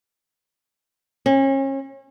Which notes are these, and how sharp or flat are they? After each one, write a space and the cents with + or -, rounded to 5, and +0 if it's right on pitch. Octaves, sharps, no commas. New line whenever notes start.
C#4 -35